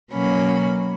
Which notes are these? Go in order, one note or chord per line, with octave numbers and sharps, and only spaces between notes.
B2 F#3 A#3 C#4 B5